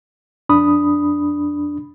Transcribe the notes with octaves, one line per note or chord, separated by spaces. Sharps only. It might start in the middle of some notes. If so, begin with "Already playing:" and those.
F2 D4 B5 D#6